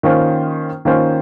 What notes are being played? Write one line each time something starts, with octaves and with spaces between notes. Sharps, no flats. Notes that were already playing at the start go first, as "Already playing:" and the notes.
D#3 A#3 C#4 F4 C5
D#3 A#3 C#4 F4 C5